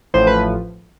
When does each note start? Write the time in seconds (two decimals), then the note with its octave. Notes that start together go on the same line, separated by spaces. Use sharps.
0.14 A1 A2 F3 C5
0.27 B4